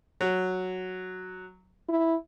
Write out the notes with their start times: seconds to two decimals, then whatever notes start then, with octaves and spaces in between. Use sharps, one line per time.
0.21 F#3
1.89 E4